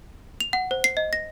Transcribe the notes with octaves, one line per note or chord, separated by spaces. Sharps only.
F7
F#5
C5
C7
D#5
A#6